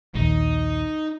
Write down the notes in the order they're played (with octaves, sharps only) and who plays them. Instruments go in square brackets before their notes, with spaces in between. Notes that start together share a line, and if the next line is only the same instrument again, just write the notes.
[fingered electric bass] A#1 D#2 [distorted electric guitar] D#4